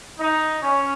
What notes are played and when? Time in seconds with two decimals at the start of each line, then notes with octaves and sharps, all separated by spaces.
0.19 D#4
0.62 C#4